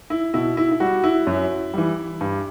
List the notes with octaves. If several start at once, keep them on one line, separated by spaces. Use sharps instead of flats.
E4
B2 E4
E4
E4
G3 F#4
E4
F#2
E3 G3
G2